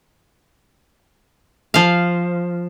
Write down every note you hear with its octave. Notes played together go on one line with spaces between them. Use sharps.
F3 F5